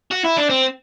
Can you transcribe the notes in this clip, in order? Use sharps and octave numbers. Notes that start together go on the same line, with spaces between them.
F#4
E4
D4
C4